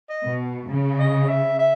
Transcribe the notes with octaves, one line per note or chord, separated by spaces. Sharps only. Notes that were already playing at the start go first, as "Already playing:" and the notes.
D#5
B2
C#3
D#5
E5
E5